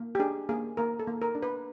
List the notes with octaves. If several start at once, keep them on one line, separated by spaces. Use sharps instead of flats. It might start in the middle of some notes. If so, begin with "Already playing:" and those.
Already playing: A#3
G4
D4 G#4
A#3 G#4
A#3 A#4
A4
A#3
A#4
D4
B4